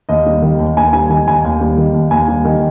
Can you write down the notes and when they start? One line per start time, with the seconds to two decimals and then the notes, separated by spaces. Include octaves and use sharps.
0.09 D#2 D#5
0.26 G3
0.42 D#3
0.59 D#2
0.77 D#2 G#5
0.93 G3 G#5
1.10 D#3 G#5
1.27 D#2 G#5
1.44 D#2
1.61 G3
1.78 D#3
1.94 D#2
2.11 D#2 G#5
2.28 G3
2.45 D#3